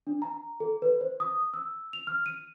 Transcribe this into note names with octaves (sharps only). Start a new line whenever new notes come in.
D4
A#5
A4
B4
C5
D#6
E6
F7
F6
D#7